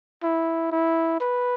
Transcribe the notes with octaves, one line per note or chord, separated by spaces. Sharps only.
E4
E4
B4